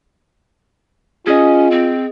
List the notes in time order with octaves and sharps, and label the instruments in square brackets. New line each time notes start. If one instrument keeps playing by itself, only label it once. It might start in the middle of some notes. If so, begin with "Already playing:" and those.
[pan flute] C#4 [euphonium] F4 [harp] G#4 D#5
[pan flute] C4